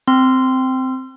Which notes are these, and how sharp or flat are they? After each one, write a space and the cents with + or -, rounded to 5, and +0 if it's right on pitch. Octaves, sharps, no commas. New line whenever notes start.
C4 -10 C6 -10 E6 +45